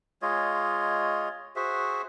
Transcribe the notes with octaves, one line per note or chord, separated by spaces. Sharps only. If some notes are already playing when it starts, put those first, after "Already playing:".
G#3 F4 C#5 D#5
F#4 G#4 C5 E5